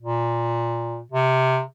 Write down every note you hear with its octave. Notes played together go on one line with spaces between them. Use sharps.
A#2
C3